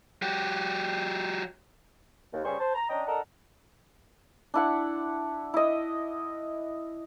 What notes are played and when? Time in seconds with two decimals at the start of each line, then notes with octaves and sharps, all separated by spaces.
0.22 F#3 G4
2.34 D#2
2.45 G2 C#3 G3 G#4 C5 C#6
2.60 C5 A5
2.75 A#5
2.90 C#4 D4 D#5 G5 A#5
3.07 D4 A4 A#4 D#5 F#5 A#5
4.54 D4 E4 F#5
5.54 E4 D#5